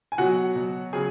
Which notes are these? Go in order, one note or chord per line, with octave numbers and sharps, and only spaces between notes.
G#5
B2 F#3 F#4 F#5
B2 F#3
C#3 F#3 G#4 G#5